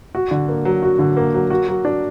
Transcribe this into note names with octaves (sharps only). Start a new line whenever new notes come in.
F#4
D3
A#3
F#3
F#4
D3
A#3
F#3
F#4
F#3
D4